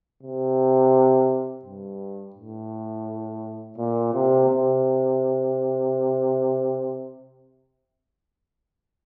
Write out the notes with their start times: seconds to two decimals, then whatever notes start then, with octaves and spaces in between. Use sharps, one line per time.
0.23 C3
1.65 G2
2.36 A2
3.78 A#2
4.14 C3
4.49 C3